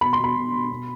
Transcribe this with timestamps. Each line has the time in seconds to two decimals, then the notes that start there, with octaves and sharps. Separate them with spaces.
0.01 B2 B5
0.13 C6
0.19 B2 B5
0.35 B2
0.53 B2
0.70 B2